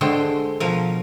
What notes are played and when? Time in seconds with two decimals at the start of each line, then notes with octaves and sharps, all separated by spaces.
0.01 D3 G#3 A3 C5 G5
0.60 B2 F3 A#4